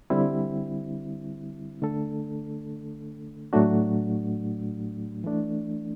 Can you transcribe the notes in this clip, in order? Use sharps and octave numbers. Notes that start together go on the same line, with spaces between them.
D3 G3 C4 E4
D3 A3 D4 A4
A2 F#3 A3 D4 F#4
E3 A3 D4